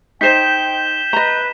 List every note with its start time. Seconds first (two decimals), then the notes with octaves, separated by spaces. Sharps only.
0.21 D#4 C5 D#5 G5 G6 B6 E7
1.13 B4 D#5 A#5